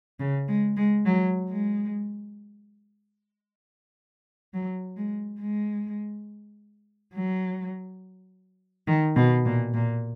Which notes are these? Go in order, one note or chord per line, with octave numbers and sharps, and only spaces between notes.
C#3
G#3
G#3
F#3
G#3
F#3
G#3
G#3
F#3
D#3
B2
A#2
A#2